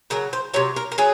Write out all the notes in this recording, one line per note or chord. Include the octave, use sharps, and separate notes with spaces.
C#3 F#3 A#4
C5
C3 F#3 C#5
A#4
A#4
F#3 G#4